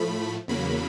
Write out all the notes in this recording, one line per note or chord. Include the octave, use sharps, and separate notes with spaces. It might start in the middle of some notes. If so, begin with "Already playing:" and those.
Already playing: A2 F3 A3 B5
E2 C#3 F#3 A#3 B5